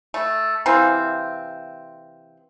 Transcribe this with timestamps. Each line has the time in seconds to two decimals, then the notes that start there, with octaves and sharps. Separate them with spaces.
0.14 A3
0.66 C3 E3 A#3 C4